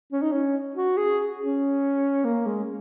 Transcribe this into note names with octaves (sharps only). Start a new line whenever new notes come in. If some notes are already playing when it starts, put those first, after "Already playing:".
C#4
D#4
C#4
F#4
G#4
C#4
A#3
G#3